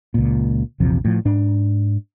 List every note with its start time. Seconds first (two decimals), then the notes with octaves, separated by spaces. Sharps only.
0.14 C#2 A#2
0.80 A#1 E2 C3 F3
1.05 A2 F3
1.25 G#2 D4